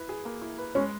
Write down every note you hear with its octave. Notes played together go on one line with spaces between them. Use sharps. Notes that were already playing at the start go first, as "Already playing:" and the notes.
Already playing: E4 B4
G#4
A#3
E4
B4
G#3 C#4